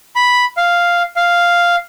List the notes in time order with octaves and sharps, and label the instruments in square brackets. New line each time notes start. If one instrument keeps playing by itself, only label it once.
[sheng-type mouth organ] B5
F5
F5